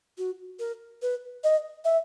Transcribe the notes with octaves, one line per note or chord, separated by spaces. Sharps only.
F#4
A#4
B4
D#5
E5